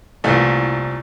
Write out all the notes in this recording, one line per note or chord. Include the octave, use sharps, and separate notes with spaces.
C2 A#2 E3 A3